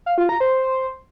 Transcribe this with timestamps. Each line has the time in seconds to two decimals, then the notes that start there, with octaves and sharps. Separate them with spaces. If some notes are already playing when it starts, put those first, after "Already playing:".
0.06 F5
0.18 F4
0.29 A#5
0.40 C5